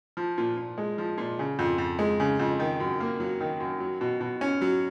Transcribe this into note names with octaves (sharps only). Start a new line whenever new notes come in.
F3
A#2
A#2
G#3
F3
A#2
C#3
F2
F2
G#3
C#3
F2
D#3
F#2
A#3
F#3
D#3
F#2
F#3
B2
B2
C#4
F#3